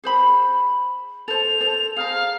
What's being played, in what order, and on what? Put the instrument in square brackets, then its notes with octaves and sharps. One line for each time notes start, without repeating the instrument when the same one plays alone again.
[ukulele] G#4 C5 B5
[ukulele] A4 C5 [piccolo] F7
[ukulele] A4 C5
[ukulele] G#4 C5 A#5 [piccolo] F5